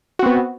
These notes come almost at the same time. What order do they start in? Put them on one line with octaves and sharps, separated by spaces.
F#4 C4 B3